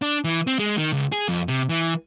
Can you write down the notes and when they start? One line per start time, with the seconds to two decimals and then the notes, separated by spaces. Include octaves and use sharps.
0.02 D4
0.24 E3
0.47 C4
0.59 G#3
0.78 D#3
0.93 C#2
1.12 G#4
1.29 F2
1.48 C3
1.69 E3